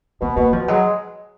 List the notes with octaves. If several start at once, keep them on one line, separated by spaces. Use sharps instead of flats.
B2 B3
B2 A#3
B2 F3
F#3 G#3